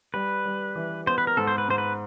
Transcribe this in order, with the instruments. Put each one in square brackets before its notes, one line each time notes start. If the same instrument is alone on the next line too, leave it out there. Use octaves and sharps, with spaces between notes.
[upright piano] G3 [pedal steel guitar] B4
[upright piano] G3
E3
[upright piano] B3 [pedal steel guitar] C5
[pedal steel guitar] B4
A#4
[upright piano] G#2 [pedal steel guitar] A4
[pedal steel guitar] C5
B4
[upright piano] G#2 [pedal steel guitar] C5
[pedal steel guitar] B4